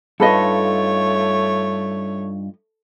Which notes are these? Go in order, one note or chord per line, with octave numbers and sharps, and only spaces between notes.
G2 A3 D#4 F4 A4 B4 C#5 D#5